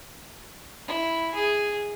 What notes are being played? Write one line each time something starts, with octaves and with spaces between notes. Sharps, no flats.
E4
G#4